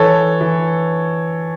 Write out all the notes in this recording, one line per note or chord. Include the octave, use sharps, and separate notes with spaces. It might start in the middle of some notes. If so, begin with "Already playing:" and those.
Already playing: E3 A4 C#5
E3